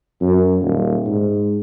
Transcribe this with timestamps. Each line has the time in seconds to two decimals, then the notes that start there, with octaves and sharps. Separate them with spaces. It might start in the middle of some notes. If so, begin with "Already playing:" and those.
0.21 F#2
0.62 D#1
1.06 G#2